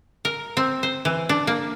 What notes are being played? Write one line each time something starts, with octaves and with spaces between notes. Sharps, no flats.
A#4
C4
C5
E3
D4
A#3